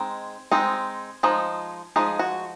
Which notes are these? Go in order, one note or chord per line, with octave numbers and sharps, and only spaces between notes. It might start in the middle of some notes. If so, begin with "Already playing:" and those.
Already playing: G#3 C4 D#4
G#3 C4 D#4
F3 G#3 D#4
F3 G#3 D#4 G#4
F#4